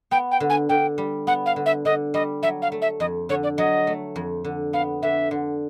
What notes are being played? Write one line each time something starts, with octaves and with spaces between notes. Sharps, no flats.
B3 G5
G5
D3
G#5
D3 G5
G3
B3 F#5
F5
D3
E5
D3 D#5
G3 D#5
F#3 E5
F5
A3
E5
F2 D#5
D3 C#5
D5
F#3 D#5
A3
F2
D3
B3 F5
D3 E5
D3